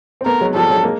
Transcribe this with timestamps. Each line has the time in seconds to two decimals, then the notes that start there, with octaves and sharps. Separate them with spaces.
0.21 C4
0.26 A3 B3 A#4
0.40 F#3 G#3
0.55 F3 G3 A4
0.69 F#3 G#3
0.83 G#3 A#3